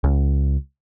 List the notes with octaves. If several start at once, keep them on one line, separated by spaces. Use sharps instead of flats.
C#2